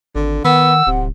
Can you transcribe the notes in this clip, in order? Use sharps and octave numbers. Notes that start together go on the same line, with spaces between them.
G#1 D3
D#3 B3 F#5 E6
D1 C3